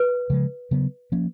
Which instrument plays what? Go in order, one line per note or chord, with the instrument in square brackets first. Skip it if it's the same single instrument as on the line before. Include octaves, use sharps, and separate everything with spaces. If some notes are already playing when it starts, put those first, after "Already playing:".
Already playing: [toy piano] B4
[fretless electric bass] C#3 F3 G#3
C#3 F#3 B3
F3 A#3 C#4